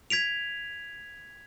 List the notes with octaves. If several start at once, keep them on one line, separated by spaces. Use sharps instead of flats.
G#6 B6 D7 F7